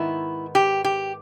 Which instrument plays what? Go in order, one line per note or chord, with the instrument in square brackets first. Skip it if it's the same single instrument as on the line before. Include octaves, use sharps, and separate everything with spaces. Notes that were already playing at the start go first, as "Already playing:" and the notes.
Already playing: [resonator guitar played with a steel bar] G#2 D#3 B3 E4
G4
G4